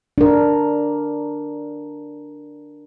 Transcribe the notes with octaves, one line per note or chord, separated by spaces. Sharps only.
D4 A#4